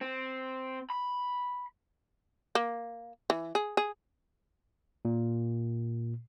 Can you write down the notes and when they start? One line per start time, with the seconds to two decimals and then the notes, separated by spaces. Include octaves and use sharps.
0.01 C4
0.90 B5
2.55 A#3
3.30 E3
3.55 G#4
3.77 G#4
5.05 A#2